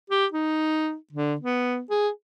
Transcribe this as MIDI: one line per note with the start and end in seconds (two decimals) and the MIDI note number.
0.10 0.26 67
0.32 0.95 63
1.13 1.36 50
1.41 1.81 59
1.90 2.09 68